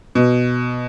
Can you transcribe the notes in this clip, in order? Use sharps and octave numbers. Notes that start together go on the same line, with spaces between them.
B2